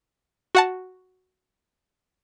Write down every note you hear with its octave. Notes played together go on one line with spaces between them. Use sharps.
F#4 F#5 A5